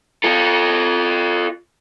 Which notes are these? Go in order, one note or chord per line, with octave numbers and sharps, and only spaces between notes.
F4 A4